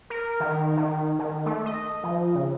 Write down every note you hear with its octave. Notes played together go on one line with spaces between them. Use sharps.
A#4
D#3
D#3
D#3
A3
D#5
F3
C#3